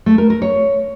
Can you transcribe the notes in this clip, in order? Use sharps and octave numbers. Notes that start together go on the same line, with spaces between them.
A3
A#4
A#4
C#5